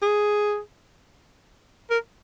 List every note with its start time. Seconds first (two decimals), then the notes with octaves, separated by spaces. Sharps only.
0.02 G#4
1.91 A#4